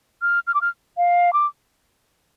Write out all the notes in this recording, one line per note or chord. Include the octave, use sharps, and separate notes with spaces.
F6
F6
D6
F6
F5
D6